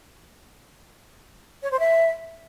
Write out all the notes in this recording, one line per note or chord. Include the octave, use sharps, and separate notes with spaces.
C#5
C5
E5